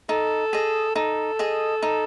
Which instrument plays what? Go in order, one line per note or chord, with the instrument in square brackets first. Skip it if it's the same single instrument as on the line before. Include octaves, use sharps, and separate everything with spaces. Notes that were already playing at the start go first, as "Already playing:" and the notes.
[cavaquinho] D#4 [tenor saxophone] A4
[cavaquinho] G#4 D#5
[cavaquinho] D#4 [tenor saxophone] A4
[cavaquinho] G#4 D#5
D#4